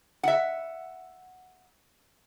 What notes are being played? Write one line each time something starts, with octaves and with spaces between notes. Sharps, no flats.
E5 F#5